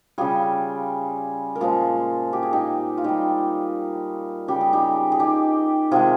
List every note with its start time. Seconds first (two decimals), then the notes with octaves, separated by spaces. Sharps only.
0.18 C#3 G3 F4 G#4
1.55 A#4
1.61 A#2 F3 G#3 F4 G#4
2.33 G4
2.43 G#4
2.53 D#4 G4
2.98 F4
3.04 A#2 G3 D#4 G4
4.48 C#3 G3 G4
4.61 G#4
4.73 D#4 G4
5.12 G#4
5.20 D#4 G4
5.91 C3 D#3 G#3 F4 G#4